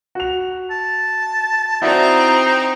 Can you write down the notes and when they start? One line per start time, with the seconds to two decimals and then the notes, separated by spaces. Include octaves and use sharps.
0.15 F#4 F7
0.71 A5
1.82 C4 D#4 E4 F#4 D5 A#5